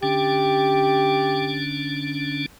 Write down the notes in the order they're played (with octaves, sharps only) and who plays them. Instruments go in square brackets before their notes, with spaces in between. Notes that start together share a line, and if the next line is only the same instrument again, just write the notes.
[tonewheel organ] D3 C#4 D4 [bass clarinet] G4